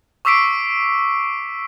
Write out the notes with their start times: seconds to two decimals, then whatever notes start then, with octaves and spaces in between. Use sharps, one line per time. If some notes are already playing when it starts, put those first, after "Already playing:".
0.25 C#6 D6 E6 B6 C7 D7